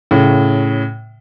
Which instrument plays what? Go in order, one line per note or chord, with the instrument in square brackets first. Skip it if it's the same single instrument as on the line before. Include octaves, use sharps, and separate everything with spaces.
[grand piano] A2 C#3